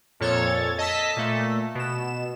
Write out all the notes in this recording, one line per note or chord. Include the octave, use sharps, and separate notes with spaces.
F2 A#2 A4 C#5 G#6 A6
D#5 A5 E6 B6
A#2 A3
B2 E7